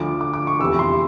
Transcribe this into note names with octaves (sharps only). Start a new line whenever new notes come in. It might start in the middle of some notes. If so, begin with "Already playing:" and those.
Already playing: D2 D3 F3 D6
D6
D6
C#6
F1 E2 C3 E3 E6
C6